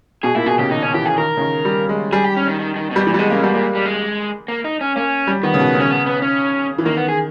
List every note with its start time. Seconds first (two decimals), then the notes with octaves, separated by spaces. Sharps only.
0.23 B2 G#4
0.35 A#2 E4
0.46 B2 G#4
0.59 C#3 G4
0.71 D#3 D#4
0.83 C#4
0.94 E3 G4
1.05 G#4
1.18 D#3 A#4
1.37 C#3
1.41 D#3
1.65 G3
1.89 G#3
2.12 G3 G#4
2.24 G4
2.37 C#4
2.47 D#3
2.60 D#3
2.76 D#3
2.91 B2
2.96 G3
3.07 A#2 E3
3.14 G3
3.18 B2 G#3
3.30 C#3 A#3
3.42 B2 G3
3.54 A#2 A#3
3.75 G3
3.85 G#3
4.48 A#3
4.65 D#4
4.81 C#4
4.96 A#3 C#4
5.27 G3
5.43 D#3 B3
5.54 C#3
5.59 B2
5.75 C#3 C#4
5.91 B3
6.06 B3
6.22 C#4
6.78 E3
6.86 D#3 A#3
6.97 B3
7.08 G#4